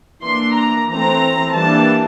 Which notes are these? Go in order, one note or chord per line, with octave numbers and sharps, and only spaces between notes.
E3 A#3 D4 C6
A#5
E3 A3 C4 A#5
E3 G3 A#3 D4 A5